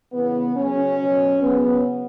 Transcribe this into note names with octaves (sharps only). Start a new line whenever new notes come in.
C#3 E3 B3
C#3 F#3 C#4
B2 F#3
C#3 F#3 B3